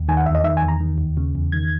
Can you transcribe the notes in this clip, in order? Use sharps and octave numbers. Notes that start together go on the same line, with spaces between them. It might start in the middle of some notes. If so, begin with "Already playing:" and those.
Already playing: D#2
D#3 G#5
F#5
E2 E5
D#5
D#3 E5
G#5
E2
A#5
D#3
D#2
C#3
E2
D#3 G#6